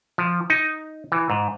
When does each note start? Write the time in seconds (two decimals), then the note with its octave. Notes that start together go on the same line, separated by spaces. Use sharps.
0.18 F3
0.50 D#4
1.12 E3
1.30 G#2